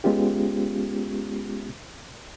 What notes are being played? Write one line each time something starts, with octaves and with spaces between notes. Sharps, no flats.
G#3 B3 C#4 F4 G4